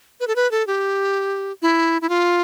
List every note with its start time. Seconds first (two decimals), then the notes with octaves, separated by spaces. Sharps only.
0.20 B4
0.27 A4
0.36 B4
0.51 A4
0.67 G4
1.62 E4
2.02 E4
2.09 F4